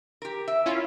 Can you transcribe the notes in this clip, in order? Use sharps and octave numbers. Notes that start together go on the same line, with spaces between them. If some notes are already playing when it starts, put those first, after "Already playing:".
G4 A#4
E5
C#4 E4 F4